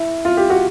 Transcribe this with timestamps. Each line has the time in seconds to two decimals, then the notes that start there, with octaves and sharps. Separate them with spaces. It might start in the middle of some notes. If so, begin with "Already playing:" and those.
Already playing: E4
0.25 F4
0.37 G4
0.50 F#4